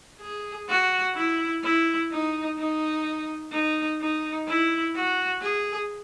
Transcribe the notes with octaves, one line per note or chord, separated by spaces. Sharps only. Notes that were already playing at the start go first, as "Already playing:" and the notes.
G#4
F#4
E4
E4
D#4
D#4
D#4
D#4
E4
F#4
G#4